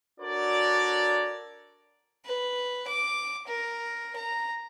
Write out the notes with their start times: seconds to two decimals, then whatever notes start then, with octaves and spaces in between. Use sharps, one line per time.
0.20 D4 F#4 A4 A#4 C#5 D5
2.25 B4
2.88 D6
3.47 A#4
4.16 A#5